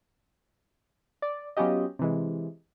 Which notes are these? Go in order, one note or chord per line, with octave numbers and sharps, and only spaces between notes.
D5
F#3 B3 C#4 F4 G4 D#5
C3 E3 G#3